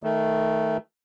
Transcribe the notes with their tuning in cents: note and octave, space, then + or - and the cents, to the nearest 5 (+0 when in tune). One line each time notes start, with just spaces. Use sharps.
D#3 +15 A3 +0